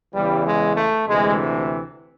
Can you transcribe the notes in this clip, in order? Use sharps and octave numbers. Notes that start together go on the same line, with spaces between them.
E2 C#3 E3 G3
G#3
A3
D2 C3 E3 G#3